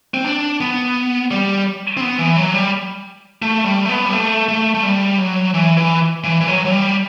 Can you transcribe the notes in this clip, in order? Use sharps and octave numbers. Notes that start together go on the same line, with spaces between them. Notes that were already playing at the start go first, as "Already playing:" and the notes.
C4
D4
B3
G3
C4
B3
E3
F#3
G3
A3
G3
A3
B3
G3
A3
A3
A3
G3
F#3
E3
E3
E3
E3
F#3
F#3
G3